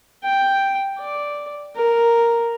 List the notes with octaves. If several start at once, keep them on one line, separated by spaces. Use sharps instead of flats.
G5
D5
A#4